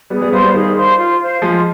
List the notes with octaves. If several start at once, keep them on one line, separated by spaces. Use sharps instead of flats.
G3 B3 G#4
G3 B3
G3 B3 C5 F5 C6
G3 B3
D#3 G3 G#4
C5 F5 C6
F4
C5 F5
F3 G#3 F4